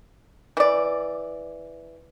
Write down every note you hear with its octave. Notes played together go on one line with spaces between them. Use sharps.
E3 D5